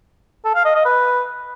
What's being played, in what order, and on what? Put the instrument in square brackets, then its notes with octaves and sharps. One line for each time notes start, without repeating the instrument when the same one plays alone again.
[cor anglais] A4
F5
D#5
D#5
B4